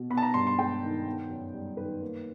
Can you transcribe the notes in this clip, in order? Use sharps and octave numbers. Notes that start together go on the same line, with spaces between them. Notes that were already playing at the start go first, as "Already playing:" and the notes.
Already playing: B2
B3 B5
A5
A#5
G2 C6
C6
G#3 G5
D#3
B3
F#2
G3
D#3 B4
A#3